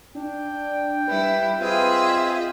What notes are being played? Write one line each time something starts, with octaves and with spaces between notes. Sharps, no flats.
D4 G5
G3 E4 B4
C4 F4 G#4 D#5 E5